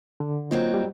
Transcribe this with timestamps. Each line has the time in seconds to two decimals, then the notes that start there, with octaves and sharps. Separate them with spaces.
0.20 D3
0.51 F#3 A#3 C4 D#4 F4
0.74 G3